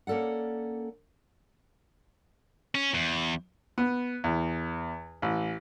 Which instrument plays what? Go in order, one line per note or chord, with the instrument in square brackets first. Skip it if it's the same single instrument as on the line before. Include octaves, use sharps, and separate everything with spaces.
[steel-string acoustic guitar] A#3 C#4 A4 D5 F#5
[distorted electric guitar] C#4
E2
[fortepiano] B3
E2
A1